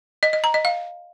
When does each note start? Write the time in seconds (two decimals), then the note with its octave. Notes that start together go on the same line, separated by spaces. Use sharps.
0.23 D#5
0.33 D#5
0.44 A#5
0.54 D#5
0.65 F5